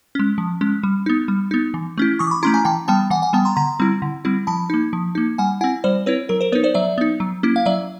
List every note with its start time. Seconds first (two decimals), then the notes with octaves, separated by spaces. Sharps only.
0.15 G#3 C#4
0.38 F3
0.61 G#3 C#4
0.83 G3
1.06 B3 D#4
1.28 G3
1.51 B3 D#4
1.74 E3
1.98 A3 C#4 E4
2.19 E3 C#6 D#6
2.27 D6
2.31 B5 C#6
2.43 A3 C#4 E4 A#5 C6
2.54 G#5 A#5
2.65 E3 G5 A5
2.88 G3 B3 G5 A5
3.10 E3 F#5 G#5
3.22 F#5 G#5
3.33 G3 B3 G5 A5
3.45 A#5 C6
3.56 D3 A#5 C6
3.80 G3 C4 E4
4.02 D3
4.25 G3 C4 E4
4.47 F3 A5 B5
4.70 A#3 D#4
4.93 F3
5.15 A#3 D#4
5.38 G3 F#5 G#5
5.61 E4 F#5 G#5
5.64 C4
5.84 G3 C5 D5
6.06 C4 E4 B4 C#5
6.29 F#3 A#4
6.41 A#4 C5
6.52 B3 D#4 B4 C#5
6.64 C5 D5
6.74 F#3 D5 E5
6.98 B3 D#4
7.20 F#3
7.43 A#3 C#4 E4
7.56 F5
7.65 F#3 D5 E5